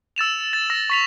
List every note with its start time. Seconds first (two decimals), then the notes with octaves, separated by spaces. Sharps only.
0.16 E6 A6 E7 F7
0.53 A6
0.70 E6 A#6
0.90 C#6 B6 F7